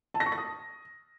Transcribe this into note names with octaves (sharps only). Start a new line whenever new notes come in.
A5
A#6
C#6
A#6
D#6